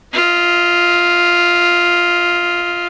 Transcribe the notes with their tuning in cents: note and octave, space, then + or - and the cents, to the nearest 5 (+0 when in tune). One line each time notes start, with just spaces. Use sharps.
F4 +0 D#5 +40